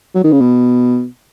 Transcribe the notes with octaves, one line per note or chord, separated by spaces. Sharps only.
F#3
D#3
C#3
B2